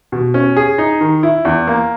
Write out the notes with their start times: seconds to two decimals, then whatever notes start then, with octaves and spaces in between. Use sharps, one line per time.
0.12 B2
0.34 C#4
0.56 G#4
0.78 D#4
1.01 D#3
1.23 E4
1.45 E2
1.67 A#3